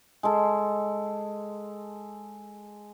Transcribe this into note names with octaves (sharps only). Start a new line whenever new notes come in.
G#3 A4